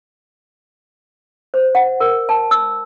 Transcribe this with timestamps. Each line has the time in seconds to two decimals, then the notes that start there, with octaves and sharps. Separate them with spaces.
1.54 C5
1.75 F#5
2.00 A#4
2.29 A5
2.51 E6